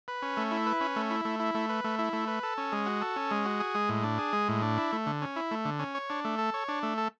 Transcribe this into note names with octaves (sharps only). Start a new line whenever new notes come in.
B4
C#4
A3
E4
B4
C#4
A3
E4
A3
E4
A3
B4
A3
E4
A3
B4
A4
C#4
G#3
F#4
A4
C#4
G#3
F#4
G#4
G#3
A2
D4
G#4
G#3
A2
D4
E4
A3
D3
C#4
E4
A3
D3
C#4
C#5
D4
A3
A4
C#5
D4
A3
A4